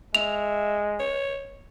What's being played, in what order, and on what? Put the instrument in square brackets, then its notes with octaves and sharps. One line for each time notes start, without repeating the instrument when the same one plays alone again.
[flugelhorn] G#3 [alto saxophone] E5 [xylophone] F7
[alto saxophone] C#5